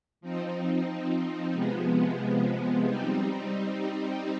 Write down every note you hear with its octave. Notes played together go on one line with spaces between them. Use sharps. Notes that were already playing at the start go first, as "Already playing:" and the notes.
F3 C4 D#4
C3 F3 G#3 B3
G3 C4 D#4